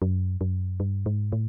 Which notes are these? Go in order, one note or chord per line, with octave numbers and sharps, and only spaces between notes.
F#2
F#2
G2
G#2
A2